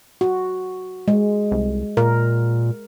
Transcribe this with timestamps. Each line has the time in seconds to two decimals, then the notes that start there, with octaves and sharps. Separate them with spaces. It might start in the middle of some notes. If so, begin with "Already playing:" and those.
0.21 F#4
1.08 G#3
1.52 C2
1.97 A#2 A#4